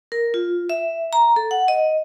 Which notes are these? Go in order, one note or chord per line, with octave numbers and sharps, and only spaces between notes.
A#4
F4
E5
A#5
A4
F#5
D#5